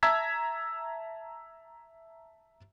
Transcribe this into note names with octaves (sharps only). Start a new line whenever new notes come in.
E5 A5 A#5 E6 G#6 B6